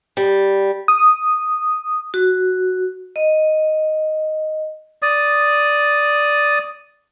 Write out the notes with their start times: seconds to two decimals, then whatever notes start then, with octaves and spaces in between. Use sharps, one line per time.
0.17 G3
0.88 D#6
2.14 F#4
3.16 D#5
5.02 D5 D#6